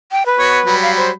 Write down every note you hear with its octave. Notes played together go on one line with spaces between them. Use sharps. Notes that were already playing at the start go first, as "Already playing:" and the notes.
G5
B4
B3 F#4 C#5
F#3 G3 B5
F5
C5